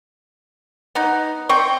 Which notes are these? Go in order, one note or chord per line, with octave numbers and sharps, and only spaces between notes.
B3 D#4
C4 G5 C#6